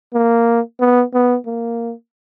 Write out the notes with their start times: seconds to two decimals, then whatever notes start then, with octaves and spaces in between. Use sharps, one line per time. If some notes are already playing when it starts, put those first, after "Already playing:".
0.14 A#3
0.80 B3
1.14 B3
1.47 A#3